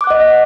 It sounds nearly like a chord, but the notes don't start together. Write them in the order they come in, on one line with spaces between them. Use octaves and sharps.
D6 F#6 F#5 D#5